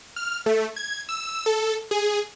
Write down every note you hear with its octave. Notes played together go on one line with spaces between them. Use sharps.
F6
A3
G#6
E6
A4
G#4